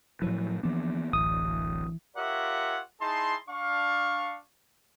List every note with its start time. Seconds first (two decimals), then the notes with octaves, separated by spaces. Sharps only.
0.22 A2 F3 F#3 E4 B4 C#5
0.63 D2 E3 F3 A#3 B3 D4
1.13 D1 A1 E3 D#6
2.16 F4 G4 A#4 C#5 E5 F#5
3.01 D#4 E4 G#4 A5 C6
3.49 D4 F5 C#6